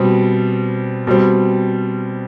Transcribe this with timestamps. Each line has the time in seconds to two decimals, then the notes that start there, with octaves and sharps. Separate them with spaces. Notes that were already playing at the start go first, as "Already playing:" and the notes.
Already playing: B2 G3 C4
1.07 B2 G3 C4